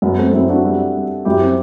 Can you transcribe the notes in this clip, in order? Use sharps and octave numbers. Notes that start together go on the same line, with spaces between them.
F#2 B3
A3 C4
F#2 C4 E4
D4 F#4
G3
G3
F#2 E4 G4
C4 E4